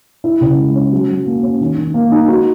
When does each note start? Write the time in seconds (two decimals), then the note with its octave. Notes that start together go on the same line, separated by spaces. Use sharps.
0.24 E4
0.41 C#3
0.58 G#3
0.75 C#4
0.92 F#3
1.09 F#3
1.26 A#3
1.43 C#4
1.61 D#3
1.77 D#3
1.94 A#3
2.12 D#4
2.28 F#4